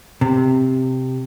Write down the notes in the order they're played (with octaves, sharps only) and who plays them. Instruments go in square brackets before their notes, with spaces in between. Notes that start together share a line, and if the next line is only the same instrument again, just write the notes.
[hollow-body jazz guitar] C3